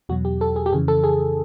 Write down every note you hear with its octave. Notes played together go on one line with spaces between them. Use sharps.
E2 B2 F#3 F#4
G4
A4
G#4
G4
F2 C#3 E3 G#4
A4
G#4